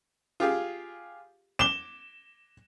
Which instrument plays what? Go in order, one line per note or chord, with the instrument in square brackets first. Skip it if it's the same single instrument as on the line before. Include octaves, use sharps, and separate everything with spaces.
[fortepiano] F4 G4 G#4
[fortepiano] D6 [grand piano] E7 G7